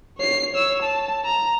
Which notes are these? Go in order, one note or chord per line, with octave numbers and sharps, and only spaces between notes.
C#5 C7
C#5 E6
A5
A#5